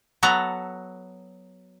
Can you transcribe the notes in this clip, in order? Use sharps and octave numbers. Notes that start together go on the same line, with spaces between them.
F#3 B3 F#4 A4 A#5